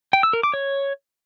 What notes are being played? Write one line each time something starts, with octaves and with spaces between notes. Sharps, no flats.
G5
E6
A#4
D6
C#5